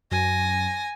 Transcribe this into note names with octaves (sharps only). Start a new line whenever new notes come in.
F#2 G#5 A#6